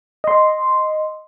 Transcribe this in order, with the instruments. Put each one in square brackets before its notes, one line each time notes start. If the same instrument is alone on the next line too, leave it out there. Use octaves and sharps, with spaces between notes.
[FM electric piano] D#5 C6